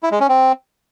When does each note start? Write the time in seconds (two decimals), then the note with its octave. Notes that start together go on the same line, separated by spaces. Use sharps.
0.03 E4
0.12 G#3
0.20 C#4
0.29 C4